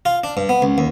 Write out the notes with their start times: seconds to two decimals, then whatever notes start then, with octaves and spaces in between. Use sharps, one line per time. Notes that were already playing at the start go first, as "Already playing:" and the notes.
0.05 F4
0.24 D4
0.37 G2
0.49 B3
0.62 C#2
0.78 D#2